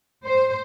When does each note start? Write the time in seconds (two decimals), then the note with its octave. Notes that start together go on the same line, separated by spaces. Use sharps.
0.25 C5